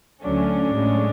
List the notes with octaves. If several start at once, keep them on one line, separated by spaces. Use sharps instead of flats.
D2 D3 F#3 A3 C#4 D4
A2 G#3 C#4